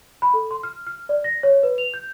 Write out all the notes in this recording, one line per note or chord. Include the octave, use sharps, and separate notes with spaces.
B5
A4
C6
F6
F6
D5
A#6
C#5
B4
F7
G6